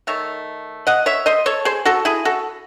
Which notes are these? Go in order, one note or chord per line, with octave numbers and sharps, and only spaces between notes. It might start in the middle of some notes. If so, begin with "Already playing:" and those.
D#3 A3 C#5 E5
D#5 F#5
C#5 E5
C5 D#5
A4 C#5
G#4 C5
F#4 A4
E4 G#4
F#4 A4